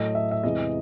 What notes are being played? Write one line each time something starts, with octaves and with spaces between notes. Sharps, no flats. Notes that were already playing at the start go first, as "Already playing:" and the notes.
Already playing: A2 F#3 A3 D#5
E5
E5
E2 C3 E3 G#3 D#5